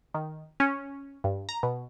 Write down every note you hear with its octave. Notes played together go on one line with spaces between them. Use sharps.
D#3
C#4
G2
A#5
B2